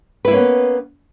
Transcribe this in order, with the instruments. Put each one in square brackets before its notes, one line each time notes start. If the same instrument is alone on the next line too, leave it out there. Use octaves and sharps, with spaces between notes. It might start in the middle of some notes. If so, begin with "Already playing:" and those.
[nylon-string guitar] B4
E4
A#3
C#4
B3